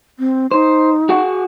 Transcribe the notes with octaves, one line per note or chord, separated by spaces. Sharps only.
C4
D#4 C5
F#4 G#4 F#5